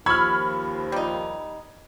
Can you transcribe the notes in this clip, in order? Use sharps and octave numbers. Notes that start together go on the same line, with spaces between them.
D#2 F3 B5 C#6 E6 F6 G#6
G3 D#4